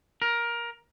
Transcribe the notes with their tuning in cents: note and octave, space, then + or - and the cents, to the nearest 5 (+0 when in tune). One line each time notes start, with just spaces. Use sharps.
A#4 +15